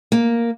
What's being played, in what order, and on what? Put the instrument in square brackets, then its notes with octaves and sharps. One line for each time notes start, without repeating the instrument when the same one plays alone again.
[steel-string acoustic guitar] A#3